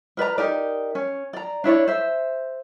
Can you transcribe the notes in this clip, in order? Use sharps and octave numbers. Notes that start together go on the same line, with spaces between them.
A#4 B4 D5 A#5
D#4 G4 A#4 D5
C#4
D5 A#5
D4 E4 C#5 D5
C5 E5